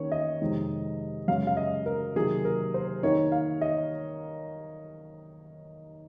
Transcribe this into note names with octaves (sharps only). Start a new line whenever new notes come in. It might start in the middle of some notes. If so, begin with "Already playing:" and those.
Already playing: D#3 A#3 C#4 C#5
D#5
F2 C3 D#3 G#3
F#2 C#3 G#3 C#4 F5
F5
D#5
A#4
C3 D#3 F#3 A#3 G#4
A#4
C5
D#3 A#3 D#4 C#5
F5
D#5